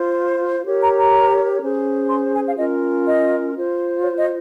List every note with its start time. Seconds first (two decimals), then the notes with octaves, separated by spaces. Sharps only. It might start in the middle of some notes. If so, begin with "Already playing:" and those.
Already playing: F4 C5
0.65 G4 A#4 C#5
0.81 A#5
0.97 A#5
1.62 C#4 G#4 C5
2.10 C6
2.34 G#5
2.46 F5
2.58 C#4 F4 A#4 D#5
3.06 D#5
3.54 F4 C5
4.02 C#5
4.19 D#5